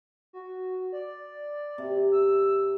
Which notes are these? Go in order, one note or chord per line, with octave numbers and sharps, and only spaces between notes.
F#4
D5
C3
E6